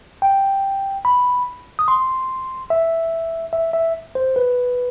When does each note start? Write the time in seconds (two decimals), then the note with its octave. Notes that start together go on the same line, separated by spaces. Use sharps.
0.22 G5
1.05 B5
1.79 D#6
1.88 C6
2.70 E5
3.53 E5
3.73 E5
4.15 C5
4.36 B4